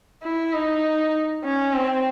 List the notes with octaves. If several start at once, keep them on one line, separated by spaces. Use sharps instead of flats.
E4
D#4
C#4
C4